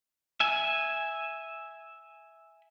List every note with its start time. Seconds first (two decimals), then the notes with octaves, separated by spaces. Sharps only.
0.40 E5 G#5